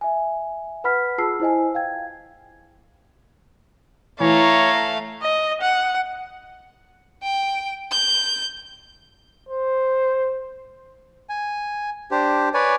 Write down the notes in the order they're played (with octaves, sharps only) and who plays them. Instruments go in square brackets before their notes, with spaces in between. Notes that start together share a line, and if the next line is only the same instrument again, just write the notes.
[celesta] E5 G#5
B4 F#5 B5 F6 B6
F4 G#4 A5 E6 C7
E4 C5 D#5 G#5
F5 G5 G#6
[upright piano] E3 [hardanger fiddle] A3 F5 [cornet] C#5 [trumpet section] A#5
[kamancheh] D#5
F#5
[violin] G5
G6
[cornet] C5
[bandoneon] G#5
D4 G4 C5
B4 C#5 D5 G#5